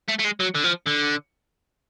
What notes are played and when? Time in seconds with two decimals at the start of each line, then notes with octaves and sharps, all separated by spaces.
0.09 A3
0.20 A3
0.25 G#3
0.40 F#3
0.55 D3
0.64 F3
0.87 D3